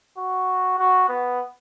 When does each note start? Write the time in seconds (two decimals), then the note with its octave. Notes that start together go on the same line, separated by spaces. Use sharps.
0.18 F#4
0.78 F#4
1.09 B3